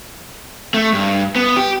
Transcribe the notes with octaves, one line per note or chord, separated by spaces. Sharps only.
A3
G2
B3
G4